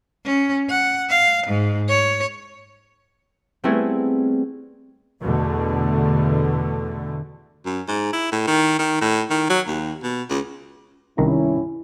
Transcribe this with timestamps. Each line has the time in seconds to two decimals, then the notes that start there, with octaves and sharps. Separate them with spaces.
0.25 C#4
0.69 F#5
1.09 F5
1.47 G#2
1.89 C#5
3.64 G3 A3 B3 C4 E4 G#4
5.20 E2 B2 D3 A3
7.65 F#2
7.88 G#2
8.13 E4
8.32 A2
8.47 D#3
8.79 D#3
9.01 A2
9.30 D#3
9.50 F#3
9.67 D#2
10.03 B2
10.30 C#2
11.18 C2 G2 D#3 C#4 E4 A#5